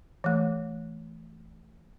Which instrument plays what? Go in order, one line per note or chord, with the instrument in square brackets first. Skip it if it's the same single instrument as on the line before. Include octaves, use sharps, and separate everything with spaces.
[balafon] E3 A3